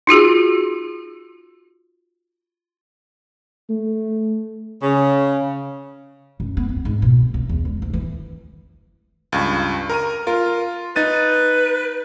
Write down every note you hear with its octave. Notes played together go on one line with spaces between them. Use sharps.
D#4 F4 F#4 G#4
A3
C#3
F#2
B3
C4
G#2
B2
C2
E2
G#3
D2
E3
C#2 G2
A#4 A#5 D#7
F4 A#4
D#4 B4 A6 D#7